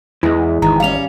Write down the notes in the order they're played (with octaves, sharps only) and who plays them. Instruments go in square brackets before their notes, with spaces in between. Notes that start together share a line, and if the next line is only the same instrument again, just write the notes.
[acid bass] E2 [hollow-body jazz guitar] E3 G#3 [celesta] E4
[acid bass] G#1 [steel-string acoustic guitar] D#3 [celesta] A#5
[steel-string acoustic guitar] G3 C#4 [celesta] F5 F7